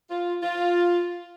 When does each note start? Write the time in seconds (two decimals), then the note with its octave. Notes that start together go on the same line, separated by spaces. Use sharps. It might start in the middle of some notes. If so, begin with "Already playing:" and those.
0.10 F4
0.43 F4